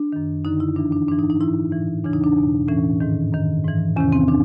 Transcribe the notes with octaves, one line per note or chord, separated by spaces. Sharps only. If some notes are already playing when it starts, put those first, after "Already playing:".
Already playing: D4
F#2 D#3
F#2 D3 D#4
E4
G2 E3 D4
D4
G#2 E3 D4
D#4
D#4
G#2 E3 E4
A2 E3
E2 C#3 E3 D4
D#4
D4
E2 B2
A2 E3 C#4
G#2 D#3
F#2 D#3
G#2 E3
E2 C3 D#3 C#4
C4
D4